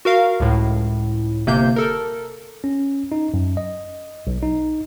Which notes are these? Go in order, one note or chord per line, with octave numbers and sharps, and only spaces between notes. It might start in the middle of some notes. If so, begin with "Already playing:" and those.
F#4 A#4 F5
C#2 A2
G1 C3 A#3 G6
A4 A#4
C#4
D#4
F#2
D#5
B1
D#4